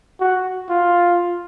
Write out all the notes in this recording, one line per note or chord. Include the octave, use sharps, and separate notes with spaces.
F#4
F4